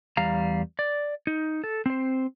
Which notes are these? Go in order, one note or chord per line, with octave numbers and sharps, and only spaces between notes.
E2 G3 F5 A#5
D5
D#4
A4
C4 C5